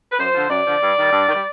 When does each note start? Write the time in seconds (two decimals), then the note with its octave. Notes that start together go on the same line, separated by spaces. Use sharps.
0.12 B4
0.19 F#2 C5
0.34 D3 F3
0.50 F#2 D5
0.66 D3 F3
0.82 G2
0.98 D#3 G3
1.13 G2
1.29 D#3
1.34 G3